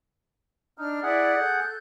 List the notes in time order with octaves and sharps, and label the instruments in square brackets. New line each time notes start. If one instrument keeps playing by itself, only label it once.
[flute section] D4 F6 [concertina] D#4
[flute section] E4 D5 [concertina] G#4 F#5
[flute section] A4 F#6 G6